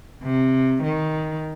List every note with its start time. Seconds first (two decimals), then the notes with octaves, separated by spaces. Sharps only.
0.23 C3
0.83 D#3